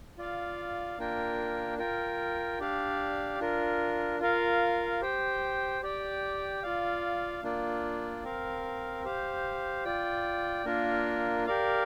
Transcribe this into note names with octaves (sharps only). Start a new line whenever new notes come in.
F4 D5 F5
A#3 D4 F4 A#4 G5
F4 A#4 G5
D4 G4 D5 F5
D4 F4 A#4
F4 A#4 F5
G4 C5 G5
G4 D5 G5
F4 D5 F5
A#3 D4 F4 D5
C4 A#4 F5
G4 C5 F5
F4 D5 G5
A#3 D4 F4 A#4
G4 A#4 D5 F5